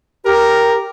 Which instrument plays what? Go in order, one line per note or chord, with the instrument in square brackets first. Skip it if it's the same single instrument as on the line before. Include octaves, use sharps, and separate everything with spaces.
[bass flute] G4 [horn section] A#4